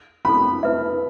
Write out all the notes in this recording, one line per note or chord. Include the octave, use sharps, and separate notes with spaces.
C#4 E4 A4 B5
E4 B4 E5